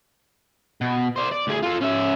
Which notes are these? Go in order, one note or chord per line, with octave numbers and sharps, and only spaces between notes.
B2
C5 D5
D5
D2 G#4
F4 A4
C#4 E5